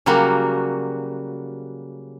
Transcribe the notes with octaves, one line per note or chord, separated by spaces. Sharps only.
C#3 F#3 G3 A#3 F#4